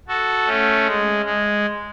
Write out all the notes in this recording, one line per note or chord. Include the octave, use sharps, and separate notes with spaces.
F#4 A4
A3 C#4
G#3
G#3